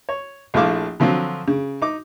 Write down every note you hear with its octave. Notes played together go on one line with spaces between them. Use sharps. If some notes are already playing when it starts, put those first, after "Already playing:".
C#5
A#1 F3 A3 E4 F5 D6
D3 F3 F#3 C4 F4
C#3
D#4 D6